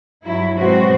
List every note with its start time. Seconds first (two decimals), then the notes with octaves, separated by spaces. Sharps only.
0.22 G2 F#3 E4
0.55 G#2 B2 F#3 C4 F#4 C5